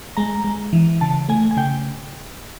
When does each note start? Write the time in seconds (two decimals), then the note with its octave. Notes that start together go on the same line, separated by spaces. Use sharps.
0.17 G#3 A#5
0.44 G#3
0.73 E3
1.01 C#3 A5
1.29 A3 G#5
1.51 G#5
1.57 C#3 G5